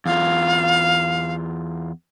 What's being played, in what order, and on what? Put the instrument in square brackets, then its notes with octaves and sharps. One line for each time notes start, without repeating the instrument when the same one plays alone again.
[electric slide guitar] E2 F4 [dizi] F5